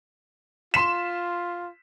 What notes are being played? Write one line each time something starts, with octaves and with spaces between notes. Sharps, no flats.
F4 C6 B6 E7